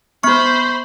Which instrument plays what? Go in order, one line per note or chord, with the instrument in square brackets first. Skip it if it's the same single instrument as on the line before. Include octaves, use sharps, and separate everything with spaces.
[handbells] B3 C#6 [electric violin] C5 B5